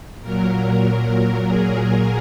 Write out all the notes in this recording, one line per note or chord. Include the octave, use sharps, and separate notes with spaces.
A#2 F#3 A#4
G#4